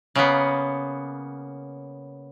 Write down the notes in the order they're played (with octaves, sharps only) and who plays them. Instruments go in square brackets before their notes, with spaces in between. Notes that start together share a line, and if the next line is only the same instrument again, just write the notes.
[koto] C#3 A#3 B3